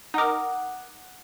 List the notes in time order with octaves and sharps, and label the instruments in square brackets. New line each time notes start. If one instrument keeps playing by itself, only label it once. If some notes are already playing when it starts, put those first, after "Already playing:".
[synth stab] D#4 A#4 [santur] F#5 [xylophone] D6 D#6